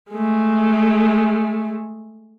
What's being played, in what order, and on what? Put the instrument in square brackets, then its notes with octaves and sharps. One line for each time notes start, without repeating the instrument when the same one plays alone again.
[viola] G#3 A3